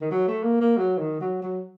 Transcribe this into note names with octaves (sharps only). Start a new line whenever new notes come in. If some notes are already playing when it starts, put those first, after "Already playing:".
D#3
F#3
A3
A#3
A#3
F#3
D#3
F#3
F#3